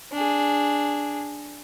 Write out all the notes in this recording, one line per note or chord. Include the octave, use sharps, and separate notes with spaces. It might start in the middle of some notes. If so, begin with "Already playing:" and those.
D4 G#4